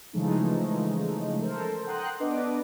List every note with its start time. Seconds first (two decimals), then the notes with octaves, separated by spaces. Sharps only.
0.13 C#3 E3 F3 G#3 A3 D#4
1.42 A4 A#4 C5
1.87 F#5 G5 A#5 C6 D#6 F#6
2.20 B3 D4 B4 D#5 D6